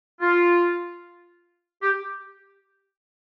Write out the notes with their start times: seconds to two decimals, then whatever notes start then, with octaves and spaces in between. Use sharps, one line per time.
0.21 F4
1.83 G4